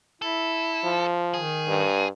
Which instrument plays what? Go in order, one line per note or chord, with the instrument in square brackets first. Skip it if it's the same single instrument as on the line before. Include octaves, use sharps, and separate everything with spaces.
[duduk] E4 [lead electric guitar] A4
[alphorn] F3
[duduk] D#3 [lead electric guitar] G#4
[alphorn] G2